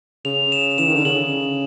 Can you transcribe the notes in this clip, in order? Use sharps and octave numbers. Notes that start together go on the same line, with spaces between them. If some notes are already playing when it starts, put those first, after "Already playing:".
C#3 F7
E7
E3 E7
D#3
D3
C#3 F#7